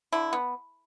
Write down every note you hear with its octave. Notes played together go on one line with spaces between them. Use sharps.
D3 E4
B3